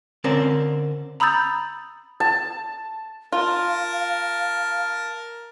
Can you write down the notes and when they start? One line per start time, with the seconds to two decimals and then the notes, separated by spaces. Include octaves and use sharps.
0.24 D3 C4 C#4 A#4 C5 D5
1.20 A#5 B5 D#6 E6 G6 A6
2.20 A5
3.32 F4 A#4 F5 A5